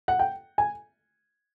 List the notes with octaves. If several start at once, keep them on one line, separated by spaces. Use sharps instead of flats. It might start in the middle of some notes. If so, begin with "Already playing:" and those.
F#5
G5
G#5